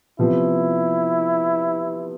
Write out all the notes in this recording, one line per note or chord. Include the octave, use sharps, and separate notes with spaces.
C3 F3 B3 E4